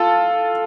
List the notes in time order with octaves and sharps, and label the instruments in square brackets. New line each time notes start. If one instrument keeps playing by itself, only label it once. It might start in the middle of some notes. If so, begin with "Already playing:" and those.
Already playing: [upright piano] F4 A4